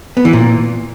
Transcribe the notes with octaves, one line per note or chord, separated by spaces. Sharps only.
B3
E3
A#2